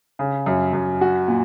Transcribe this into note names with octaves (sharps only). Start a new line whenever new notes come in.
C#3
F#2
F#2
F#4
A#2